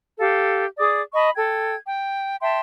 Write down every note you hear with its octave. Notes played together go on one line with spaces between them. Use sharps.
G4 A4 F5
G#4 D5 D6 D#6
D#5 A5 B5 C#6
A4 G5 G#6
G5
E5 G5 A5 C6